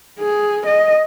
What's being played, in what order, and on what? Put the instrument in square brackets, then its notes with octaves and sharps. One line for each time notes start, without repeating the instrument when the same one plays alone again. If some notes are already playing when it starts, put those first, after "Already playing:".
[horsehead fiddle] G#4
D#5